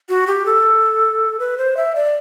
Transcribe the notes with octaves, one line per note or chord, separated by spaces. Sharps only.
F#4
G4
A4
B4
C5
E5
D5